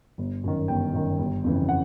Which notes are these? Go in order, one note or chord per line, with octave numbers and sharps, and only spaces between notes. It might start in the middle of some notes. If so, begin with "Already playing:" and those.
G1
F#2 D#3
G1 G5
F#2 D#3
G1
F2 C#3 E3
F#5